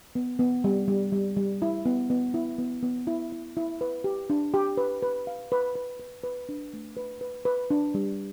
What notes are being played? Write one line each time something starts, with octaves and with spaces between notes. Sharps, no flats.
B3
B3
G3
G3
G3
G3
E4
B3
B3
E4
B3
B3
E4
E4
E4
B4
G4
D4
G4
B4
B4
F5
B4
B4
B4
B4
D4
A3
B4
B4
B4
D4
G3